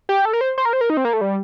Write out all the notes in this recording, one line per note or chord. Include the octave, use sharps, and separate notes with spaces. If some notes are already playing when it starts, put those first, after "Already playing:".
G4
A4
A#4
C5
C5
A#4
C5
A#4
D#4
C4
A#3
A3
G3